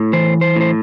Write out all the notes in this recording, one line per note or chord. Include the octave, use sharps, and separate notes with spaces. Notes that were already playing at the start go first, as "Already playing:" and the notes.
Already playing: A2
E3 C5
C5
A2 C5